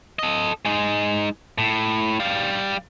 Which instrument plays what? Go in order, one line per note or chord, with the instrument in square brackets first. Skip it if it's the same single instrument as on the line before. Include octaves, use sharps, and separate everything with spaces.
[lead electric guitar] A4 D#5
G#3 D#4
A2
G3 F5